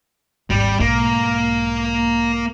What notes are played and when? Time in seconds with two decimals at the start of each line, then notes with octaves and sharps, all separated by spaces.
0.50 G#1 D#2 G3
0.80 B1 G#2 A#3